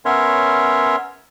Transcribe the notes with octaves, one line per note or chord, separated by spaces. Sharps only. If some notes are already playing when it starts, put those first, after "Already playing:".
B3 C#4 A#4 C#5 E5 C6